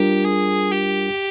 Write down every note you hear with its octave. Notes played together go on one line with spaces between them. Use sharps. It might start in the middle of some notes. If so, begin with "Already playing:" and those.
Already playing: G3 D4 F4 G4 A#4
G#4
G4